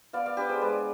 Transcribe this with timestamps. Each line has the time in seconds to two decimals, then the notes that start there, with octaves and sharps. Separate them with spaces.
0.13 B3 D5 F5
0.26 D5 F5
0.37 D4 G4 B4
0.49 G#4 C5
0.61 G#3 B4 D5